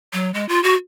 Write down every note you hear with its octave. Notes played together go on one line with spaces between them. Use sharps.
F#3
G#3
F4
F#4